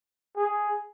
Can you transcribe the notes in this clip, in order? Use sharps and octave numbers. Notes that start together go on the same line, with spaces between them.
G#4